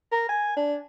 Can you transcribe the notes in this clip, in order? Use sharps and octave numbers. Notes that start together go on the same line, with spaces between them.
A#4
G#5
D4